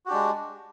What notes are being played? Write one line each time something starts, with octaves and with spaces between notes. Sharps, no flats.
G#3 D4 F#4 G4